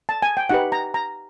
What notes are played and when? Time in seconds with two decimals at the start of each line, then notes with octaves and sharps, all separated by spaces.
0.09 A5
0.22 G#5
0.37 G5
0.49 D#4 G4 B4 F#5
0.72 A#5
0.94 A#5